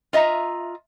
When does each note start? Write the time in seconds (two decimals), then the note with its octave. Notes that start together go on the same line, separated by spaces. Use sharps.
0.13 F4 D#5 E5 A#5